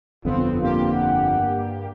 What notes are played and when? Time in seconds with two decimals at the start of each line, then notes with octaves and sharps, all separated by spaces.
0.25 G1 F2 B3 C4 F4
0.61 G2 A#3 F4 G4
0.93 F#5